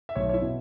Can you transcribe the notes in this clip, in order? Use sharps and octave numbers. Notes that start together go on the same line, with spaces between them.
E5
B1 C#5
C#5
E4 E5
B2